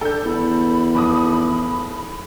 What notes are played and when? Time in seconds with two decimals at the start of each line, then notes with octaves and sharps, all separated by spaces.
0.01 D4 A4 G6
0.25 E2 B5
0.95 F1 D6 D#6